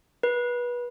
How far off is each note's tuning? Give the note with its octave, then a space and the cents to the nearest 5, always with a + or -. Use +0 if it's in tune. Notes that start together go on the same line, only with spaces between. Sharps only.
B4 -25